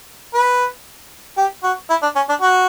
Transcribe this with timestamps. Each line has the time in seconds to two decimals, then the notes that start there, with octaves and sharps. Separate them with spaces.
0.34 B4
1.37 G4
1.63 F#4
1.90 E4
2.02 D4
2.15 C#4
2.29 D4
2.41 F#4